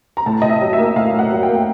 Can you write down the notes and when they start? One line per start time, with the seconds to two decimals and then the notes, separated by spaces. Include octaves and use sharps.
0.17 A#5
0.26 A2 A5
0.42 A2 D#5
0.49 E5
0.61 F#3
0.73 E5
0.78 A#3
0.96 A2 F5
1.13 A2
1.19 F#5
1.31 F#3
1.43 G5
1.48 A#3